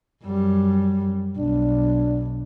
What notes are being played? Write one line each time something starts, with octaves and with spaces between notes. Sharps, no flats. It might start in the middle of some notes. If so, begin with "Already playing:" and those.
F#2 G3
B1 D4